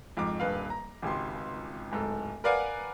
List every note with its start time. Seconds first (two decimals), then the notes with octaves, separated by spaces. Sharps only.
0.17 F2 G#2 D6
0.40 D#1 G2 B4 F5
0.70 A#5
1.02 G#1 C#2 G4 C6
1.91 D1 G#2 A4
2.44 A#4 B4 D5 F5 F#5 G#5